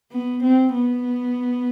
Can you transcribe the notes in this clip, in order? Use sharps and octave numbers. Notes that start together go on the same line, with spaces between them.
B3
C4
B3